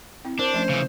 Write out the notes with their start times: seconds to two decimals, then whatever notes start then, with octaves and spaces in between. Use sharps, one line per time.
0.25 C4 E4
0.39 D4 A#4 C5 A5
0.53 F3 A3 C#4
0.69 C#3 E3